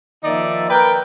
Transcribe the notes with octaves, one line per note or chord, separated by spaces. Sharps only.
D#3 F3 A#3 D#4 D5 E5
A#4 B4 G5